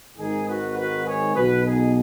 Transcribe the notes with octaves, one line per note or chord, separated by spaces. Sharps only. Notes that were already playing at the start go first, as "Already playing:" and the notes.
G#1 G#2 D#3 D#4 G#4
F#4 B4
F#4 B4
G#4 C#5
B1 B2 F#4 B4
D#4 G#4